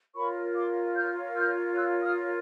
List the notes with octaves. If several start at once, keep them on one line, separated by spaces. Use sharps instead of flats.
F4 A#4 C#5 B5 C#6
C6 D6
F6 G6
F6 G6
E6 F#6
D#6 F6